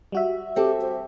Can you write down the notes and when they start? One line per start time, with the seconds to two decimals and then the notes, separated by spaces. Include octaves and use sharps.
0.12 G3 F#4 E5
0.56 C4 G4 A4
0.81 C5